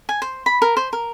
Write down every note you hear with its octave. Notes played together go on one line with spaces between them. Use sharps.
G#5
C5
B5
A#4
C5
A#4